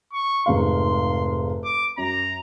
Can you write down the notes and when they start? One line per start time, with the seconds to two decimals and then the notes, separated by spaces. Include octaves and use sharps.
0.13 C#6
0.46 F1 G#2 F5 C6
1.64 D6
1.98 F#2 A#5